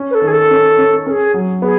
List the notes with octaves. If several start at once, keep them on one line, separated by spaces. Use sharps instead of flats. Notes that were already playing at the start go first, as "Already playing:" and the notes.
Already playing: C#4
B4
A4
D#3
G#4
A4
C#4
C#4
C#4 G#4 A#4
F#3
B3 G#4